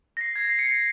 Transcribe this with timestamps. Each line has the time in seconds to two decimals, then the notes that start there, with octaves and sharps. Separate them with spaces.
0.17 A#6
0.21 C7
0.36 G#6
0.49 C7
0.59 C#7
0.69 C7